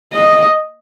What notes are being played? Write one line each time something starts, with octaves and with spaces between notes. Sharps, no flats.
D#5